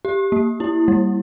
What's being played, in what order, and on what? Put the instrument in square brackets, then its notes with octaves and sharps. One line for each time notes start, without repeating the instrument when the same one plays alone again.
[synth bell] G4
A#3
E4
G3